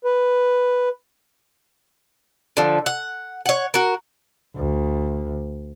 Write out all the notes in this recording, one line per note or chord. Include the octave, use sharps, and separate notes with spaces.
B4
D3 F3
F#5
C#5 F#5
F#4 A#4
D2